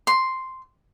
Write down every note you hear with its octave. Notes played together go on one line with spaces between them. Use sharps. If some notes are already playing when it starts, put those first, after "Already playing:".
C6